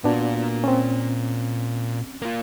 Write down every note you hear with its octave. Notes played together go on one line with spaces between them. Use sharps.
A#2 B3 D4 F4 F#4
C4 C#4
A#3 F4